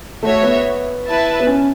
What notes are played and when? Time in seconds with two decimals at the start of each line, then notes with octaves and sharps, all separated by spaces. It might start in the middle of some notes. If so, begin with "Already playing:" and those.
0.22 A3 F#4 C#5 E5
0.43 B3
1.05 E4 B4 E5 A5
1.40 B3
1.47 C#4